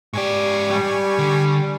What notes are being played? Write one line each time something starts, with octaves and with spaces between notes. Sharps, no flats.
G#2 G4 D5 G#5 C#6
G3
D3